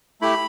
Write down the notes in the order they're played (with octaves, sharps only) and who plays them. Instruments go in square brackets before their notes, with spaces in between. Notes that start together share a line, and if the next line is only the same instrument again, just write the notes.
[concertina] A3 E4 G4 B5